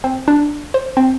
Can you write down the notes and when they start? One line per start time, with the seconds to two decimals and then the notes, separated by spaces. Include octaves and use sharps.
0.04 C4
0.28 D4
0.74 C5
0.97 C4